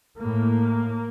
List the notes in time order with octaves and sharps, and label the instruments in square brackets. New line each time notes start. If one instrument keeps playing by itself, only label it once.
[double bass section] A2 A#3